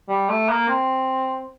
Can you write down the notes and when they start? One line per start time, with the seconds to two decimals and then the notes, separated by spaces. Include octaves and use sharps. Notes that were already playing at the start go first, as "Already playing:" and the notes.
0.09 G3
0.29 A3
0.49 A#3
0.69 C4